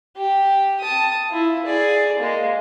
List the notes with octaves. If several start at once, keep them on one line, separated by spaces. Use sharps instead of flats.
G4
A5 D#6
E4 F4
G#4 D5
G#3 A#3